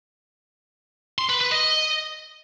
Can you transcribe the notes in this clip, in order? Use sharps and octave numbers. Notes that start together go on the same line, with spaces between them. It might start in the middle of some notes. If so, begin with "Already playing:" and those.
C6
B4
B4
D#5